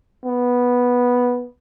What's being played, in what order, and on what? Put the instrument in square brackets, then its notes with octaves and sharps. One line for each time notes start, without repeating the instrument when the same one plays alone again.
[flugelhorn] B3